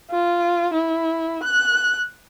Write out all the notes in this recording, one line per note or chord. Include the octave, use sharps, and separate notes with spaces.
F4
E4
F#6